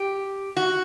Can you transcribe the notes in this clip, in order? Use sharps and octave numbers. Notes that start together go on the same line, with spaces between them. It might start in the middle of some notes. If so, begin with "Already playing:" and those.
Already playing: G4
F#4